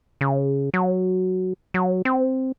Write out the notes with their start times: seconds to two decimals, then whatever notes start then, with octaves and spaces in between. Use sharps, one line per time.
0.21 C#3
0.74 F#3
1.74 F#3
2.05 C4